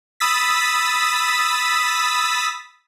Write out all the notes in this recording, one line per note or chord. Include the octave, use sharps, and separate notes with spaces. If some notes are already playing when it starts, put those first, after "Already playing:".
B5 D#6 E6 A6 B6